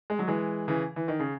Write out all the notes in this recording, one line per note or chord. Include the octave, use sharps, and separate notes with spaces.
G#3
F#3
E3 G#3
C#3 E3
E3
D#3
C#3